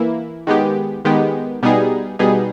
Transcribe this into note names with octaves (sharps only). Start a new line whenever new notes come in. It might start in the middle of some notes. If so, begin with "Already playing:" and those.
Already playing: E3 A#3 E4
D#3 G#3 B3 G4
D#3 G#3 B3 G4
B2 G3 B3 D#4 G#4
B2 G3 B3 D#4 G#4